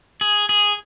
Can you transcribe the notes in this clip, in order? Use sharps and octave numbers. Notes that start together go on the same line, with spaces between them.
G#4
G#4